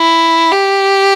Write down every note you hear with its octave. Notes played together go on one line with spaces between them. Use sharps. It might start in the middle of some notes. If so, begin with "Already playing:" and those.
Already playing: E4
G4